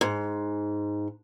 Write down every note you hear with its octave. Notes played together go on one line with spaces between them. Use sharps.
G#2